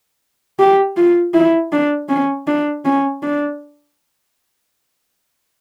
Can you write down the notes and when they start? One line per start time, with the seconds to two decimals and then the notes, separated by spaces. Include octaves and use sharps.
0.59 G4
0.97 F4
1.34 E4
1.72 D4
2.09 C#4
2.47 D4
2.85 C#4
3.23 D4